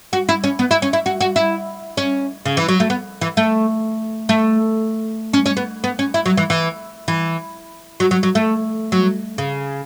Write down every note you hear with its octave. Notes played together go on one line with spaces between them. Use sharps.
F#4
E4
C#4
B3
E4
C#4
E4
F#4
F#4
E4
C#4
C#3
E3
F#3
A3
B3
E3
A3
A3
C#4
C#4
B3
B3
C#4
E4
F#3
E3
E3
E3
F#3
F#3
F#3
A3
F#3
C#3